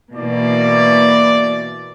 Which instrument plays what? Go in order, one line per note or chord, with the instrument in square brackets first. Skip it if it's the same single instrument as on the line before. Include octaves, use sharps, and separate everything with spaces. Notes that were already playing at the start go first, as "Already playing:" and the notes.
[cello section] B2 E3 A#3 [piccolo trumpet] D5